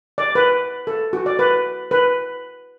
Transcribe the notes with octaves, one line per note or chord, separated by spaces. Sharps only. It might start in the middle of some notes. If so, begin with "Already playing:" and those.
D5
B4
A4
F#4
D5
B4
B4